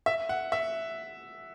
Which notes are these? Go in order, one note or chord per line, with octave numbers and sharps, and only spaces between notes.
E5
F#5
E5